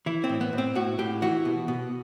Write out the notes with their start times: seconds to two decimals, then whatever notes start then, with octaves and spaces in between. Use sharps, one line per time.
0.06 E3 E4
0.24 C4
0.29 A2
0.41 B3
0.53 A2
0.58 C4
0.75 A2 F#4
0.99 A2 G4
1.22 E3 F#4
1.45 B2
1.68 B2